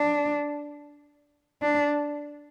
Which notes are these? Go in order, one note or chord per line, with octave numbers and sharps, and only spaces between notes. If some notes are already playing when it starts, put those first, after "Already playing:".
Already playing: D4
D4